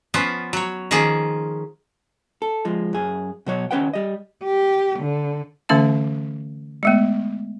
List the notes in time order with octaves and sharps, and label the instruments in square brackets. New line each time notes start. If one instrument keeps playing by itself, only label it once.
[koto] F3 B3 C#4 F4
F#3 C#5
D#3 F3 A#3 C#4 G#4
[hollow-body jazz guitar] A4
F3 G#3
F#2 G#4
B2 F#3 C#5
D#2 C#4 B4 F#5 G5
G3 D#5
[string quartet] G4
D3
[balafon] D3 E3 A3 C#4 F5 A5
G#3 A3 B3